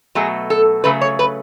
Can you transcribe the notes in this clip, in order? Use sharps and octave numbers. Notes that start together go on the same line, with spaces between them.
B2 F#3 A3 G#4
A4
C#3 F#3 A3 B4
C#5
B4